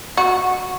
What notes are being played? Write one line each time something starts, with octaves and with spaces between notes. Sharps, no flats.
F#4